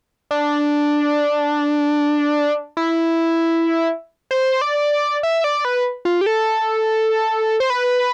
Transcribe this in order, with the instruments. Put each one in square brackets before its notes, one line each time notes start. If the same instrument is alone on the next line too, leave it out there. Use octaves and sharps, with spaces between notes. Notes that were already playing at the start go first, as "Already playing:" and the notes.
[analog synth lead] D4
E4
C5
D5
E5
D5
B4
F4
G4
A4
C5
B4